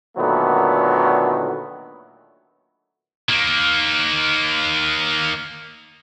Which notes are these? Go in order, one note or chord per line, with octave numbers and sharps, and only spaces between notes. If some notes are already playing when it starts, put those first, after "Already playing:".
A#2 D3 D#3 F#3 A3 B3
D#3 A#3